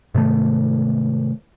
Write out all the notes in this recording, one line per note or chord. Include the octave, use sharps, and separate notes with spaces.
G#2 C3 D#3 A3